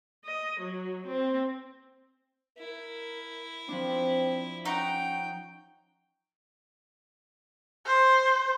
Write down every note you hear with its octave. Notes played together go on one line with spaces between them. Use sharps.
D#5
F#3
C4
E4 A#4
F3 C4 D4
C#4 D#4 F#5 G5 C#6
C5